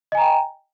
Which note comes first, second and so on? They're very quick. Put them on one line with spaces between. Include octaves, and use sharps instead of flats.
D#5 G#5 A#5 G5